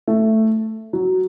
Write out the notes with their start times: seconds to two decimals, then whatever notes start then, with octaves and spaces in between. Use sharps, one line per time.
0.08 A3
0.93 F#3